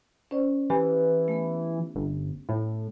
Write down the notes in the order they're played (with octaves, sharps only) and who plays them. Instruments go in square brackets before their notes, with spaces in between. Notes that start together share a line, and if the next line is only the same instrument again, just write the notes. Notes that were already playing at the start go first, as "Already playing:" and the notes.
[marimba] C#4 C5 D5
[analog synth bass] E3 [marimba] G4
[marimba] A3 B3
[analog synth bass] G1
A2